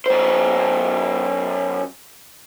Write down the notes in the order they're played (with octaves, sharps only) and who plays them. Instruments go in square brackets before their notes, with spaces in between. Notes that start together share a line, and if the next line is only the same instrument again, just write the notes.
[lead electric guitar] F#2 C5